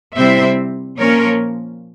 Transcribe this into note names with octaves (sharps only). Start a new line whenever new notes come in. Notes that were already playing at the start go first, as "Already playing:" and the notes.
C3 G3 C4 E4 C5 E5
A#2 F3 A#3 C#4 A#4 C#5